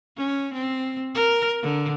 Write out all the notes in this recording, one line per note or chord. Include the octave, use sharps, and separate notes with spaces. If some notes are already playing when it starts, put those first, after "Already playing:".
C#4
C4
A#4
D3